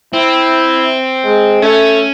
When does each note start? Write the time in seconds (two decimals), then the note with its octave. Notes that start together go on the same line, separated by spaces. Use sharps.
0.13 C4 E4
1.24 G#3
1.62 A3 C#4